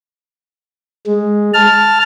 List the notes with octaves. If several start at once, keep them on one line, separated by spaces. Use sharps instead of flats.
G#3
A5 F6